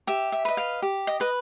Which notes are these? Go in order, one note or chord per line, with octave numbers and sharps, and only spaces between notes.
G4 E5
E5
B4 D#5
F5
G4
D#5
B4 D#5